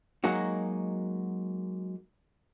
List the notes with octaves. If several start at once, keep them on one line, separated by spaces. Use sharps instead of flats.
F#3 G#3 A#3 D#4 F#4